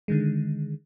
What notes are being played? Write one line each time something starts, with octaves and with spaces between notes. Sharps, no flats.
D3 D#3 G#3